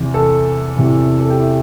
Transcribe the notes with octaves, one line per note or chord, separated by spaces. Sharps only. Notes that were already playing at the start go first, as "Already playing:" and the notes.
Already playing: E2 C3 E3
A4
E2 C3 E3
A4
G4
E4